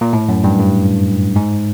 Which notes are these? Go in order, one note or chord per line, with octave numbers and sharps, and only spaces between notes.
A#2
A2
F#2
G2
G2
G#2